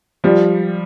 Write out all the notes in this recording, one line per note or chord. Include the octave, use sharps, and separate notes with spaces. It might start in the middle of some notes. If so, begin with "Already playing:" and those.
F3 G3